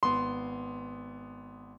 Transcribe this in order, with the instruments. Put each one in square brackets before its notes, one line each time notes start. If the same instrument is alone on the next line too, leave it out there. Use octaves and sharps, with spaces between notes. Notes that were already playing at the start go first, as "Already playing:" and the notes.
[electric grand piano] G#1 B3 [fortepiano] C6